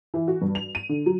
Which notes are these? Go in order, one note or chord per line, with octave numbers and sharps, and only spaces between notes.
E3
F#4
G2
F7
D#7
D3
F#3